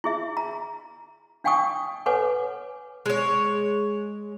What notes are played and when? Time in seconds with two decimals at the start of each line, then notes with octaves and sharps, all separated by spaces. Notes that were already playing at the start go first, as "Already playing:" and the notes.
0.04 E4 G#4 E5
0.37 A#5
1.44 D4 F5 G5 G#5 C#6 D#6
2.06 A4 B4 C#5 F#5 G#5 D6
3.06 G#3 C#5